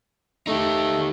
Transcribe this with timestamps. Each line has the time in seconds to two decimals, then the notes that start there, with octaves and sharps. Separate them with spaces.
0.47 A3 D#4 G4